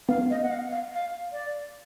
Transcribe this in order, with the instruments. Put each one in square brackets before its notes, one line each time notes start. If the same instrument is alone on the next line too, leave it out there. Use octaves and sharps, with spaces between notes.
[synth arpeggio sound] B3 [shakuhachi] F5
[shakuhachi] D#5
F#5
F5
F5
F5
D5